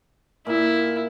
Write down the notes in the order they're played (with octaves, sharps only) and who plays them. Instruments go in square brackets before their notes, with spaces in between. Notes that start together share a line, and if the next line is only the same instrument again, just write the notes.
[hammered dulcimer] A#2 [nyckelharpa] E4